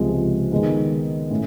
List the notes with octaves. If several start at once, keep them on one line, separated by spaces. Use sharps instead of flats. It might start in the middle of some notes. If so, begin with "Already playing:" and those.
Already playing: C#2 C3 F3 G#3 C4
D#3 G#3 B3
A2 C#4